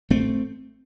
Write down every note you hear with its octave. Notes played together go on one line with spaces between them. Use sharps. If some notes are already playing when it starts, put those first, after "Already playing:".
A1 A3 C4